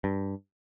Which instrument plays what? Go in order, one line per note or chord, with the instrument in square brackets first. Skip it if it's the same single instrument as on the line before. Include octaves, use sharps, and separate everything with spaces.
[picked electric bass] G2